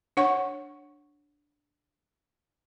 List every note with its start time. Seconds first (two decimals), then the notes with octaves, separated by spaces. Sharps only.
0.17 D4 C#5 F#5 C#6